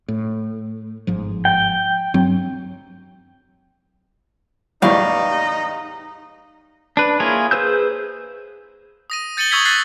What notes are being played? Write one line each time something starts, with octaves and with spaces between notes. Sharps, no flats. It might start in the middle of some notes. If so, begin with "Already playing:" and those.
A2
G1 G#2 F3
G5
G2 F#3 C4
A1 E2 G3 D#4 F5 C#6
D4 B4
A#3 E4 F4 G#4 C#5
G#4 B4 C5 E6 G6
D#6 A#6 D#7
G6 A6 C#7 D#7 F#7 G7
C#6 D#6 E6 G#6 B6 F#7
F#6 G#6 A6 B6 C7